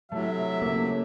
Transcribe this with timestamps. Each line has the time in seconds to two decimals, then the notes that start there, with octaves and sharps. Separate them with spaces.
0.12 C3 F#3 A3 E4 E5
0.62 C#3 A#3